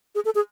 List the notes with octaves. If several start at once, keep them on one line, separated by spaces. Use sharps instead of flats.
G#4
A4
G#4